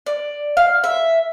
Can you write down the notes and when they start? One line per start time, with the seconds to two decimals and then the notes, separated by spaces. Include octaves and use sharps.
0.06 D5
0.57 F5
0.84 E5